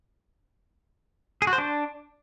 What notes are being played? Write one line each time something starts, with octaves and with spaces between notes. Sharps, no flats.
G#4
F#4
C5
D4